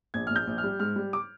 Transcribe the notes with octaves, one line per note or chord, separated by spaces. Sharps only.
A#1 G#6
A#1 F6
G6
A#1
F6
G3
G#2 F6
G3
D6